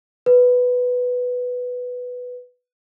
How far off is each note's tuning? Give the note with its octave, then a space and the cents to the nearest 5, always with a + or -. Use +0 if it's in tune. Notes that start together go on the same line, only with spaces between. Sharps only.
B4 +5